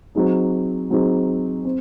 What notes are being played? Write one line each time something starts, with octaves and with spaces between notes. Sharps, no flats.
F#3 C4 D#4 G#4
F#3 C4 D#4 G#4
C4